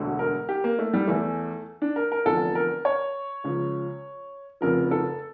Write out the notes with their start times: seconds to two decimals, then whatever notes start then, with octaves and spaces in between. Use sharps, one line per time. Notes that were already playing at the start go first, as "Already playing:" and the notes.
Already playing: E1 D2 D3
0.19 A#4
0.49 G4
0.64 A#3
0.79 A3
0.94 G3
1.08 E2 E3 A3
1.82 D4
1.96 A#4
2.12 A#4
2.25 F1 E2 D3 F3 A4
2.55 A#4
2.85 C#5
3.44 C#2 C#3 F3
4.61 F1 F2 C#3 F3 A#4
4.91 A4